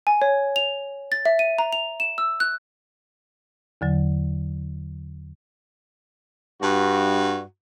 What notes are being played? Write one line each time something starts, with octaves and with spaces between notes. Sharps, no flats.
G#5
C#5
F7
A6
E5
D#7
A#5
F7
E7
E6
F#6
E2 D3 F#3
G2 F#4